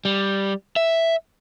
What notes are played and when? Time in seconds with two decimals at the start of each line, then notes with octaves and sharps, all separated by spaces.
0.05 G3
0.76 E5